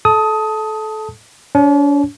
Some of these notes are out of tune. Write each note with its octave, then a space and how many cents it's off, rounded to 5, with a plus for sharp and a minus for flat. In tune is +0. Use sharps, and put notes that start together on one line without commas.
A4 -25 A5 +0 D#6 +20
D4 -45 C#5 -20